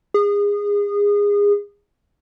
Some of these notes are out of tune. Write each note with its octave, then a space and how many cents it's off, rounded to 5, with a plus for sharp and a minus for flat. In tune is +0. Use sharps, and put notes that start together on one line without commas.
G#4 -25